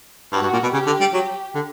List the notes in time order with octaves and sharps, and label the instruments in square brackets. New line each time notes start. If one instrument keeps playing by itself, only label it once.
[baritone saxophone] G2 [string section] F#4
[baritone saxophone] G2
A#2
B2
[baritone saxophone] C#3 [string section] G4
[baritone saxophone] D3
G3
F#3
D3